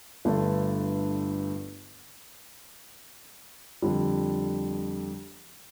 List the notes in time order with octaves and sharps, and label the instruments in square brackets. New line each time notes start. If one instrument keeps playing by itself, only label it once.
[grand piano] G1 G2 D3 A3
F2 D3 G3